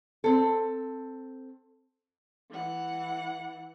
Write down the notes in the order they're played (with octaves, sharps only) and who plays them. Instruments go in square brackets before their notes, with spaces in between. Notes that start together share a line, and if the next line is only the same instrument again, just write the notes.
[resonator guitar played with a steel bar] C4 A4
[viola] E3 F#5